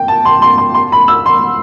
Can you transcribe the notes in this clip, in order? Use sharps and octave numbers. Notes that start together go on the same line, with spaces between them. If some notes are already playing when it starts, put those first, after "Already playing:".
Already playing: G5
A5
C6
C6
C6
C6
B5
E6
C6